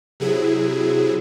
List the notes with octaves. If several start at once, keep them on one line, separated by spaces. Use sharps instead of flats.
C3 F#3 E4 G#4